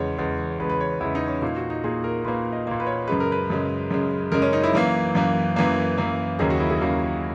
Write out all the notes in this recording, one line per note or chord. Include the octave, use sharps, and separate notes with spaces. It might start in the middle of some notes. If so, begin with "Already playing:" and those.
Already playing: E2 C#3 G#3 C#5
E2 C#3 G#3
E2 C#3 G#3 B4
B4
C#5
E2 C#3 G#3 E4
D#4
C#4
A#2 A#3 D#4
F#4
D#4
A#2 A#3 G#4
A#4
A#2 A#3 B4
D#5
A#2 A#3
B4
C#5
F#2 C#3 G#3 B4
A#4
B4
F#2 C#3 G#3
F#2 C#3 G#3
F#2 C#3 G#3 A#4
C#4
D#4
E4
F#2 E3 A#3
F#2 E3 A#3
F#2 E3 A#3
F#2 E3 A#3
D#2 C#3 F#3 A#3 G#4
F#4
E4
G#4
D#2 C#3 F#3 A#3